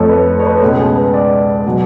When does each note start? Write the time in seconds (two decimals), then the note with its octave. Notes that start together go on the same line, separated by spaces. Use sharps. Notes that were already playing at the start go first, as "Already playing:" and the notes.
Already playing: F2 F3 A3 A4 C#5
0.09 B4
0.40 C#5
0.46 B4
0.54 A4
0.62 C#2 B2 G#3 G#4
0.79 G#4
0.96 B4
1.13 D5
1.66 B2 F#3